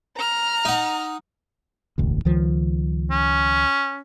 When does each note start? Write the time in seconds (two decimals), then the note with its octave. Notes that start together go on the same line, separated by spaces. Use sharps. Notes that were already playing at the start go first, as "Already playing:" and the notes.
0.17 A#5 F6
0.65 D#4 F#5
1.98 E1 A1 D2
2.25 C#2 D#3 F3
3.11 C#4